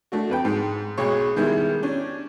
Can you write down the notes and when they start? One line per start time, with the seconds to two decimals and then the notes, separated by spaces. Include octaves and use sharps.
0.12 A3 D4 F#4
0.30 F2 B4 G5
0.45 G#2
0.98 B1 G#3 C#5 C#6
1.36 D#3 G3 G#3 B3 E4
1.83 C#4 D4